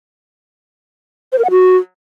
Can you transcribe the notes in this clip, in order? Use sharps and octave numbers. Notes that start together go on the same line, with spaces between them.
C5
A#4
F#5
F#4